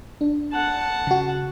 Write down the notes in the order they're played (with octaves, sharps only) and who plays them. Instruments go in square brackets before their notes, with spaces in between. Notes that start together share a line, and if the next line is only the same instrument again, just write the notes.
[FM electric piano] D4
[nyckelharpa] F#5 A5
[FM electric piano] C#3 F#4